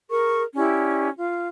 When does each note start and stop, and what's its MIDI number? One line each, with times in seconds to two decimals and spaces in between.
0.10 0.42 68
0.10 0.42 70
0.10 0.42 85
0.56 1.09 61
0.56 1.09 64
0.56 1.09 67
0.56 1.09 74
1.17 1.48 65